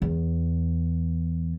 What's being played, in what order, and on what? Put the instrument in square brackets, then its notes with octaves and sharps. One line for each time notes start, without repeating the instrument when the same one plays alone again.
[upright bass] E2